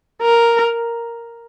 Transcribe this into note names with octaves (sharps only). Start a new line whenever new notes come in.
A#4